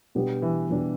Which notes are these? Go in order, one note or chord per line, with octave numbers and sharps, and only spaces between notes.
B2 G3 B3 D4 G4
E3
B2 G3 B3 D4 G4